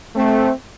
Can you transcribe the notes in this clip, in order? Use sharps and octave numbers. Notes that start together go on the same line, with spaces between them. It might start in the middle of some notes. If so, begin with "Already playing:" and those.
A3 C4